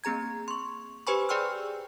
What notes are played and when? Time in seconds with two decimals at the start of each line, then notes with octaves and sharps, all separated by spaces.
0.04 A#3 C4 G#4 A#5 G#6
0.48 C6 C#6
1.07 G4 B4 C5 G#5 B5 C#6
1.29 G#4 D5 G5 C6 E6 F6